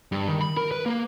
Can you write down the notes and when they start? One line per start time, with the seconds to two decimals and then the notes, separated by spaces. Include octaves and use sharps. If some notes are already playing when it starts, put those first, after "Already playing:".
0.12 G2
0.29 D#3
0.41 B5
0.57 A#4
0.71 B4
0.86 A#3